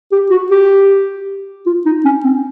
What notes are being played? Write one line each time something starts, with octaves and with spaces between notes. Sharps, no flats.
G4
F#4
G4
F4
D#4
C#4
C4